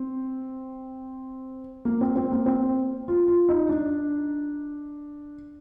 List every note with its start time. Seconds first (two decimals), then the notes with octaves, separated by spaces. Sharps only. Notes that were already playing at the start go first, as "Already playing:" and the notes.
Already playing: C4
1.85 A#3
2.01 C4
2.16 C4
2.32 A#3
2.46 C4
3.08 F4
3.28 F4
3.49 D#4
3.69 D4